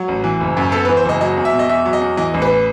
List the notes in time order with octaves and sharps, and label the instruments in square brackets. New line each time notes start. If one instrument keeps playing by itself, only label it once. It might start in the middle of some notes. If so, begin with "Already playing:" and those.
Already playing: [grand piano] F#3 F#4
A1
E3
F#1
F#2
B3 A4
E3 B4
C5
F#1 D#5
F#3 D#5
E2
E5
B2
D#5
E2 E5
F#3
D#5
E2
E3 D#5
A1
B4